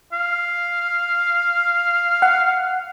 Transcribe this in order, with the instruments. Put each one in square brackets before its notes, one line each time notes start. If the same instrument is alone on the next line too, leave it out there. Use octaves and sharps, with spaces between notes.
[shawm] F5
[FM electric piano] F#5